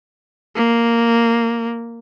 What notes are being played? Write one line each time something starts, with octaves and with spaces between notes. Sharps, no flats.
A#3